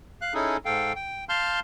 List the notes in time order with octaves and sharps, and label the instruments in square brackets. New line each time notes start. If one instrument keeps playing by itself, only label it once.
[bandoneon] F5 F#6
C#4 D#4 E4 G#4 A4
G#2 A4 F5 G5
G5
F5 A5 C6 F6 G6